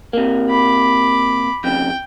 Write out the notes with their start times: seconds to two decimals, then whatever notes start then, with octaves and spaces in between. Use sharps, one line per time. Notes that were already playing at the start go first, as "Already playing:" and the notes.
0.13 C3 A#3
0.49 B5 D6
1.64 F2 C#3 G5